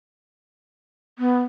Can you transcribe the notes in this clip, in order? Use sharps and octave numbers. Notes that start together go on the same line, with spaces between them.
B3